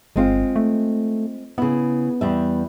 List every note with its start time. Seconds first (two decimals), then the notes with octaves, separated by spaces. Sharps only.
0.16 G1 G#3 C4 F4
0.56 A3
1.58 C#3 B3 E4
2.21 E2 G3 E5